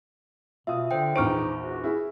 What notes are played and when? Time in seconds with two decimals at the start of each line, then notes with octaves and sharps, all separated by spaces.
0.67 B2 F4 E5 D#6
0.91 D3 C5 G5
1.16 A#1 E2 D#4 C5 C#6 F6 D7
1.59 F#4
1.84 E4 G#4